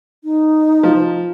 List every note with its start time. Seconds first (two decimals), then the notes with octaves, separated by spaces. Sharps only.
0.24 D#4
0.83 F3